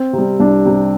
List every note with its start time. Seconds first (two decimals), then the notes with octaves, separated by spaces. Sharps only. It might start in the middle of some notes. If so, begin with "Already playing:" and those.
Already playing: C4
0.13 C3
0.18 G3
0.40 C2 D4
0.65 C3 G3